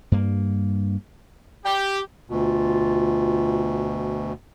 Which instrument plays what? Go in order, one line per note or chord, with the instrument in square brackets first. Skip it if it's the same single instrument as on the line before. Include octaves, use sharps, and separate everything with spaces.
[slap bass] G2 A#3
[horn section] G4
[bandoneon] D2 B2 [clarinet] F4